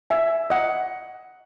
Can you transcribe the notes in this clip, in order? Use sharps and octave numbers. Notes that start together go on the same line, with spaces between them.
E5 G#5
D#5 F#5